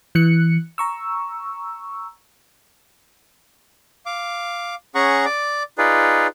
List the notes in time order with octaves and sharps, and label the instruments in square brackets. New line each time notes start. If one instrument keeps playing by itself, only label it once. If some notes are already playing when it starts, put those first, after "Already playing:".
[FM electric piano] E3 F#6 C#7
A#5 C#6 E6
[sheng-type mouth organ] F5 D6
C#4 G#4 F#5 A#5 C#6
D5 D6
D#4 F4 G#4 B4 D5